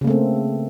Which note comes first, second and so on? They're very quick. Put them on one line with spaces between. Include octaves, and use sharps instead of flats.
C#3 A#3 A3 C4